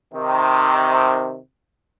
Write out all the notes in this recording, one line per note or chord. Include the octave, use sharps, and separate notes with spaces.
C3 D#3